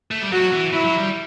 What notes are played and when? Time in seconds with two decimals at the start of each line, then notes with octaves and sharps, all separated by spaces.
0.11 A3
0.22 G3
0.32 F#3 F#4
0.53 E3
0.72 F#3 E4
0.85 F#3
0.98 G3